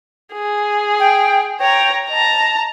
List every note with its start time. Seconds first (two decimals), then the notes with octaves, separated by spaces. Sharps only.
0.33 G#4
1.00 G5
1.60 C#5 G5 A#5
2.09 D#5 A5 A#5